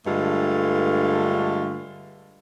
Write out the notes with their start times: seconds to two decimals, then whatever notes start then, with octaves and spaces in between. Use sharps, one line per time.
0.07 G2 D3 G#3 A3 F4